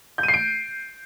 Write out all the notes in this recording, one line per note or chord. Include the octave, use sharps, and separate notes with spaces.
G6
D#7
C7
D7